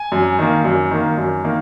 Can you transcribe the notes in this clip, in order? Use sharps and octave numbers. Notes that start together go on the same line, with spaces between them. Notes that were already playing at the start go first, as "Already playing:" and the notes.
Already playing: G#5
F#2
D#3 A#3
F#2
D#3 A#3
F#2
D#3 A#3